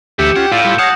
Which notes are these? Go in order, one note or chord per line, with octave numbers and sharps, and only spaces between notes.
D2 E3 F#4 G4 E5 G6 C#7 E7
C#4 F4 F#5
A2 E4 F4 D5
G3 E4
C#5 F5 F#5 A5 D#6 A#6